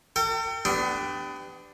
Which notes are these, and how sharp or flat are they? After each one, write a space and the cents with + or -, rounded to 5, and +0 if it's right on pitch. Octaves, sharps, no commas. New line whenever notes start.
A4 +45 G5 +0
B3 +30 D4 +5 G4 +0